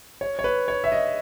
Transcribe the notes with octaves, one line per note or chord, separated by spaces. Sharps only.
C#5
C#5
B4
C#5
E5
D#5